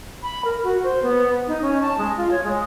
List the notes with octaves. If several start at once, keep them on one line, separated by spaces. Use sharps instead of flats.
B5
A#4
F#4
C5
B3
D#4
C#4
A5
G#3
F4
C#5
G#3